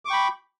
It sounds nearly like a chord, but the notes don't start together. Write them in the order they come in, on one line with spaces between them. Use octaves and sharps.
D6 C#6 G5 B5